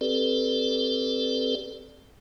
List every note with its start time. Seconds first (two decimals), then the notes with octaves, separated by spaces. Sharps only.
0.01 C4 G4 A4 B4 D5